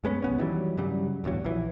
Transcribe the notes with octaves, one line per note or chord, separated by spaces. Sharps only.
F#2 G#3 B3 C#4
C2 B3 C#4
D#3 E3 F#3 G3
G2 C#3 F#3 G3
D1 E2 G2 F#3
A#1 E3